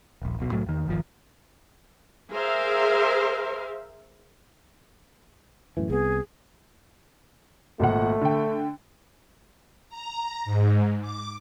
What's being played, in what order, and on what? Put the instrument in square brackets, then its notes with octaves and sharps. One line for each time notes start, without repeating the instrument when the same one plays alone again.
[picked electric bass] D#1 A#1
D#1 B1 B2
C2 A2 F#3 A3
E2 D#3
D1 G1 D#3 F3
[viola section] G#4 A#4 C5 E5 F5
[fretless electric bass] F#2 A2 E3
[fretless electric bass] C2 B3 [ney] G#4
[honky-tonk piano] G#1 A#2 F#5 [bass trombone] A3
[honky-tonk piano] D3 G5
[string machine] A#5
G#2
D6